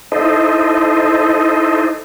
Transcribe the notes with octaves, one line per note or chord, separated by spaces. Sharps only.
D#4 E4 A4 C5 D#5